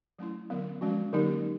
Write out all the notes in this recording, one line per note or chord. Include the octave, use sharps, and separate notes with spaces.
F#3 A3 C#4 E4
D3 F#3 B3
F3 G#3 C#4 F#4
D3 F#3 A#3 D#4 G4